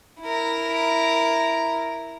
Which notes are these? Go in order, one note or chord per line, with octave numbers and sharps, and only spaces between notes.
E4 A#4